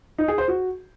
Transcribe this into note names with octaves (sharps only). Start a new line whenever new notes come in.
D#4
G#4
C5
F#4